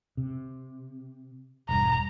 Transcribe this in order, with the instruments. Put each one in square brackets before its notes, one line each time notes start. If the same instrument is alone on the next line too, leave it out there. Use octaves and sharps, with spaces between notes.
[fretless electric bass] C3
[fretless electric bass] E1 G2 [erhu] A#5